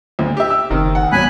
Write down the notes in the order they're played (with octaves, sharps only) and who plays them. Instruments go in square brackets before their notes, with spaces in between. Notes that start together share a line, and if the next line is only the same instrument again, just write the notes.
[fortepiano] D2
G4 E5
[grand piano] E6
[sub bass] F#1 [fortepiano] C3 D#3
[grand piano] F#5
[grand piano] G2 F#3 [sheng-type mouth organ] G#5 B5 F#6